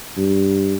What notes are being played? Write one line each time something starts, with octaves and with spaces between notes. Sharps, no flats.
G2